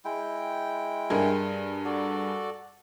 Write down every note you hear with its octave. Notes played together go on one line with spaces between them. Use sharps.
G#3 E4 G5
G2 G#4 A#4
F#4 A4 D5